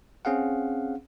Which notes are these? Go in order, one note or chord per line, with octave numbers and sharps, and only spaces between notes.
C4 C#4 G#4 F5 F#5